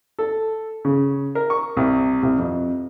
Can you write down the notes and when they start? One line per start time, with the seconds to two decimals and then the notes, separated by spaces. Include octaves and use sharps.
0.19 A4
0.85 C#3
1.35 A#4
1.50 C#6
1.77 C2
2.23 C2
2.38 F2